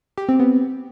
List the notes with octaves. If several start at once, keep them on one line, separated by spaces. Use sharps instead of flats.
G4
C4
B3